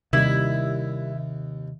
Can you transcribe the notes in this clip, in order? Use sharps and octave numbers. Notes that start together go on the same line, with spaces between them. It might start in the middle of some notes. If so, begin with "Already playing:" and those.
D#2 C3 D#3 G3 D#4 E4